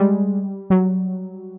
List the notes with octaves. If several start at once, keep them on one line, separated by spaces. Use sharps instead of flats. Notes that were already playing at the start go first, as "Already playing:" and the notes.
Already playing: G3 G#3
F#3